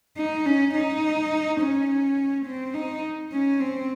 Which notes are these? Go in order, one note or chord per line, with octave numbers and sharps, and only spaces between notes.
D#4
C#4
D#4
C#4
C4
D#4
C#4
C4